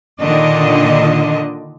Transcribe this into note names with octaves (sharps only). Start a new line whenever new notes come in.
A#2 D3 D#3 D4 D#5